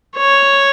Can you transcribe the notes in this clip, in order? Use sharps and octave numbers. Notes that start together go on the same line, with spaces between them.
C#5